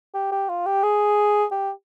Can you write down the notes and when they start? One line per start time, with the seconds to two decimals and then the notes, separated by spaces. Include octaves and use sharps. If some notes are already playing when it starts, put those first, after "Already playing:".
0.14 G4
0.32 G4
0.49 F4
0.66 G4
0.83 G#4
1.52 G4